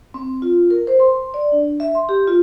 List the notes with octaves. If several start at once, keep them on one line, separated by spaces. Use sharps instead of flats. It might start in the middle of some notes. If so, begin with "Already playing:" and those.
C4
F4
A#4
C5
C6
D5
D4
E5
C6
G4
F4